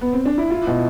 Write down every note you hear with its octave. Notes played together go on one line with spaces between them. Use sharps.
B3
C4
D4
E4
E4 F4
B2